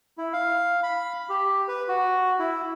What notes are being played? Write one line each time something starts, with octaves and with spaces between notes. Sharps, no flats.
E4
F5
B5
G4
B4
F#4
E4